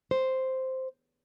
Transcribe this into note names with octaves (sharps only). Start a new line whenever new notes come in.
C5